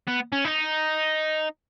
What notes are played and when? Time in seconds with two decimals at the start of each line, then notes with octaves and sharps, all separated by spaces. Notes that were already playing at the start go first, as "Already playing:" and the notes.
0.07 B3
0.32 C#4
0.45 D#4